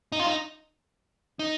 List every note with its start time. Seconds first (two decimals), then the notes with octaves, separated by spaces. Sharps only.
0.12 D#4
0.20 F4
0.27 D#4
1.39 D#4